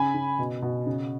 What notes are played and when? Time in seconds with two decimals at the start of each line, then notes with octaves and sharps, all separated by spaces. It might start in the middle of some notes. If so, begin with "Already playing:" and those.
Already playing: C#3 G#5 B5
0.14 C#3
0.39 B2
0.62 B2
0.86 C#3